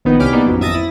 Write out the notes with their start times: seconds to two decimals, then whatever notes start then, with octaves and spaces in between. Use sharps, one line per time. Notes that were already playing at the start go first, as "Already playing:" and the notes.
0.05 A#1 D#3 B3 D#4
0.19 C2 C#4 G4 B5 D6 F6
0.33 G3 A#3 B3 D#4
0.46 A1 F2 F#3
0.60 G#1 F2 E5 D#6 A6 A#6
0.74 E4